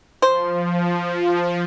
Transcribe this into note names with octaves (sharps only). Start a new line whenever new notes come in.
F3 C5